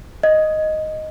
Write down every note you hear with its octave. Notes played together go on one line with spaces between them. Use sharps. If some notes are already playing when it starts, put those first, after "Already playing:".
D#5